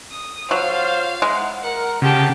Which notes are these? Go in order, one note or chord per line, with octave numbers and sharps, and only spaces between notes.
D#6
F#3 F4 C5 F5
G#3 D#4 E4 F#5
A#4 F#5
C#3 F4 G4 F#5 G5 A5